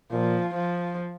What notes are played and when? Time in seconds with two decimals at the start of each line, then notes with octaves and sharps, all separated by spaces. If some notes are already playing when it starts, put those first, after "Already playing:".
0.11 A#2 F3
0.54 F3